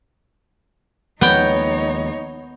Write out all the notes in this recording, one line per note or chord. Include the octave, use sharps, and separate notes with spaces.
D#2 F3 G#3 B3 D#4 C#5 G5